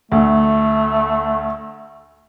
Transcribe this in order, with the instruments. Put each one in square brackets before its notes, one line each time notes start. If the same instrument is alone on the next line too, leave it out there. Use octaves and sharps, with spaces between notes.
[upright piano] D2 [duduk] A3